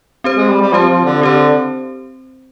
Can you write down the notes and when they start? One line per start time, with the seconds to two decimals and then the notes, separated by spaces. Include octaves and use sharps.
0.24 C4 G4 C5
0.36 G#3
0.49 G3
0.61 G3
0.73 F3 C4 G4 C5
0.90 F3
1.05 D3
1.21 D3 C4 G4 C5